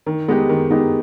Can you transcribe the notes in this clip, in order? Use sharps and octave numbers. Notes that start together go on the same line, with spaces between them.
D#3
G#3 B3 D#4 G4
D#3
G#3 B3 D#4 G4